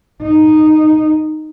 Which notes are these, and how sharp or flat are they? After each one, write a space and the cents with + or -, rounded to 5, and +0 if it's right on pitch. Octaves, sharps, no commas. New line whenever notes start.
D#4 -10